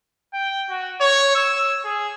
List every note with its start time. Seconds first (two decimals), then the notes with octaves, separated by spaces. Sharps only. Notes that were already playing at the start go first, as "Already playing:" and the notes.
0.34 G5
0.70 F#4
1.01 C#5
1.35 E6
1.84 G#4